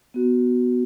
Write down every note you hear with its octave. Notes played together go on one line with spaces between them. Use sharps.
B3 F#4